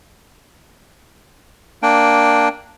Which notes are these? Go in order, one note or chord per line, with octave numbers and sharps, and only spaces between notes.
A#3 D4 G5